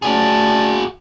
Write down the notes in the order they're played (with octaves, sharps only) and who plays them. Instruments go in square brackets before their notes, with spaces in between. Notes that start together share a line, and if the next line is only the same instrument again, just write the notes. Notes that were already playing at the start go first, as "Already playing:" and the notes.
[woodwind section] G3 A3 A5 [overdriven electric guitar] F#4 G#4